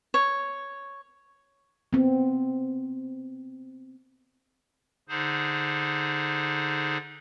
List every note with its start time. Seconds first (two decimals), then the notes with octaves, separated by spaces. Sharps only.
0.14 C#5
1.93 B3 C4
5.09 D3 D#4 G#4 C5